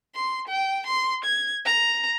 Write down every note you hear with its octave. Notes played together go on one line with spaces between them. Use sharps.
C6
G5
C6
G#6
A#5